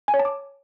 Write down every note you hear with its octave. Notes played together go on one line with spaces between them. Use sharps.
G#5
C#5
A5
D6